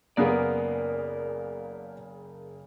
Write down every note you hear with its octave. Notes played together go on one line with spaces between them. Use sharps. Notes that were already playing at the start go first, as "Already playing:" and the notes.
F#1 C#3 A#3 B3 G#4 A#4 D5 F5